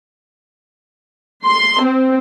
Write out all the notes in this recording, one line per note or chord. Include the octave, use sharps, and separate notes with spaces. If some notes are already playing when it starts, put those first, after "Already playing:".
C6
C4